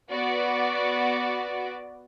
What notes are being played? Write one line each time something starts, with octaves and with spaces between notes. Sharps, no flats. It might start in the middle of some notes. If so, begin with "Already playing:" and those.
B3 F#4 D5